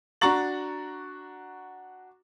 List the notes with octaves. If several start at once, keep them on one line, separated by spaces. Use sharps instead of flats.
D4 F#4 A#5 C#6 A6 F#7